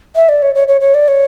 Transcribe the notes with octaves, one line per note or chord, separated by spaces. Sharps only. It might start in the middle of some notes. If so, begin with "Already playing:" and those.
E5
D5
C#5
C#5
C#5
C#5
D5
C#5